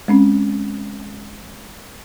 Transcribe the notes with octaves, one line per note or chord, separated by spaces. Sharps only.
G#3 C4 C#4